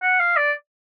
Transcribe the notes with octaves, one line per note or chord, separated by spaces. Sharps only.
F#5
F5
D5